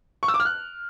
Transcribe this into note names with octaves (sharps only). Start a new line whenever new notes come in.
C#6
E6
D6
F6
F#6